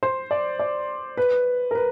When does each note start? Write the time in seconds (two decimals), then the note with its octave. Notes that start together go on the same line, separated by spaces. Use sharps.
0.03 C5
0.31 D5
0.59 D5
1.17 B4
1.71 A#4
1.75 B4